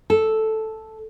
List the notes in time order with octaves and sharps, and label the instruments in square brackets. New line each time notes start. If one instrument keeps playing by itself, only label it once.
[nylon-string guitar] A4